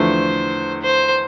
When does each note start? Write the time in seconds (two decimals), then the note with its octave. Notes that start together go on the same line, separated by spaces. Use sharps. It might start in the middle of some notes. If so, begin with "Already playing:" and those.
Already playing: E2 D3 F3 A3 C5
0.82 C5